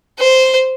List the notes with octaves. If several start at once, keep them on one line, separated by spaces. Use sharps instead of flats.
C5